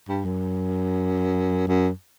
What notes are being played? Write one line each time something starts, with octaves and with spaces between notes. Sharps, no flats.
G2
F#2
F#2